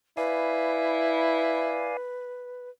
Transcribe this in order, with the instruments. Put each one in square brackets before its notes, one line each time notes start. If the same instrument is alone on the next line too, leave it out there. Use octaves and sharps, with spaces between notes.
[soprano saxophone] E4 [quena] B4 [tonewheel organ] D5 F5 G#5